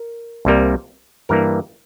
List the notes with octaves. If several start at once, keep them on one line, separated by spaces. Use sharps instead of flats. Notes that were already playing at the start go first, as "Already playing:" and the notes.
Already playing: A#4
C2 C3 G3 A#3
G2 E3 G3 A#3 A#4